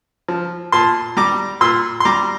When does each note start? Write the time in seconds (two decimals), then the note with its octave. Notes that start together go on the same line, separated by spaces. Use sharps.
0.28 F3
0.72 A#2 A5 C6
1.17 G3 A#5 D6
1.61 A#2 C6 E6
2.00 C6
2.05 G3 A#5 D6